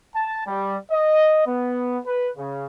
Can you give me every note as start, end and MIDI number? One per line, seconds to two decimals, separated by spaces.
0.15 0.41 81
0.47 0.76 55
0.91 1.43 75
1.46 1.98 59
2.05 2.29 71
2.38 2.66 49